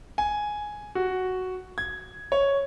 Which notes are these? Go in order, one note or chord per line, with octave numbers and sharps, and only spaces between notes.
G#5
F#4
G#6
C#5